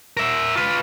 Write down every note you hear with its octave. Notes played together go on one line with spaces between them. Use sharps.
A#4 E5
F4 B4